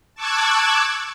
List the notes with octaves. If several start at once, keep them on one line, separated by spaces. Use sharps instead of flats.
A5 C#6 D6 E6 F#6 G#6